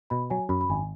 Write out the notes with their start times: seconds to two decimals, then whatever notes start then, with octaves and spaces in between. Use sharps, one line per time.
0.10 B2 B5
0.30 F#3 G#5
0.49 F#2 B5
0.61 B5
0.70 G#1 G#5